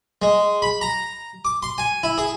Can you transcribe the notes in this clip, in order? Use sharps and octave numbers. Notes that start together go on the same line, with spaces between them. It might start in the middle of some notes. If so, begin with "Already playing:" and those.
G#3
B5
A#5
D6
C6
G#5
E4
G#4